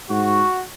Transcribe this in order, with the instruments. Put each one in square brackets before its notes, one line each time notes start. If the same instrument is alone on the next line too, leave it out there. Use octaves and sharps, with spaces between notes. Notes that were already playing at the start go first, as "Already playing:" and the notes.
[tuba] G#2 [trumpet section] F#4